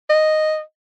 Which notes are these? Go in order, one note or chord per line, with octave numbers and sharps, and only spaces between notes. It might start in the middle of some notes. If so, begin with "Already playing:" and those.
D#5